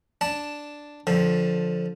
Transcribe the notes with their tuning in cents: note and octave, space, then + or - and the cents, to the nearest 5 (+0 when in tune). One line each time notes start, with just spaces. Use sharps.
D4 +0 A5 +0
D3 +0 F3 +10